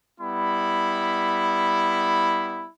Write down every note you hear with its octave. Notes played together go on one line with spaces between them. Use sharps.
G3 B3 E4 B5